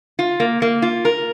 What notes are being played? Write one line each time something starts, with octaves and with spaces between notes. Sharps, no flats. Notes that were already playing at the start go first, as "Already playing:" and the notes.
F4
A#3
A#3
F4
A#4